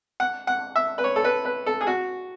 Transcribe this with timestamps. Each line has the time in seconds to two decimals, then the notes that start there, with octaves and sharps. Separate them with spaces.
0.20 F#5
0.47 F#5
0.76 E5
0.98 B4
1.04 C#5
1.16 A4
1.24 B4
1.45 B4
1.66 A4
1.81 G#4
1.87 F#4